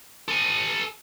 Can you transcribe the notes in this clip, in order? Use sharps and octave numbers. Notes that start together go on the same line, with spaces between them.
A4 G#5